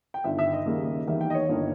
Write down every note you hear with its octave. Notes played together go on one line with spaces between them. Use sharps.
G5
G1 G2 D#3 E5
E5
D#5
D#2 C#3 G3 A#3
E2 D#3 G3 A#3 E5
G5
D#5
C#5
G1 G2 D#3 A#3